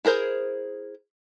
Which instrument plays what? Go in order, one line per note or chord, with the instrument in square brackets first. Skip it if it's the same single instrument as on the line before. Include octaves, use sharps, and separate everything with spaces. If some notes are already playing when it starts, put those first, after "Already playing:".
[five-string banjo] E4 G#4 A#4 C5